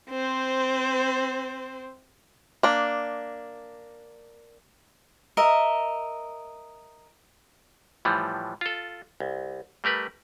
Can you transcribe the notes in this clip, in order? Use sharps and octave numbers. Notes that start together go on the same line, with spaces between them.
C4 C5
A#3 D4
A#4 D#5 E5
A2 E3 F3 G3
F4 A4
C2
G3 A3 A#4 B4